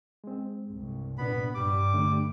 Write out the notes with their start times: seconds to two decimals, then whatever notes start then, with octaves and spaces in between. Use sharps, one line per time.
0.24 G#3 C4
0.67 C2 G2
1.18 A#2 B3 D4 B5
1.54 G2 G3 D6
1.94 D3 A3 D4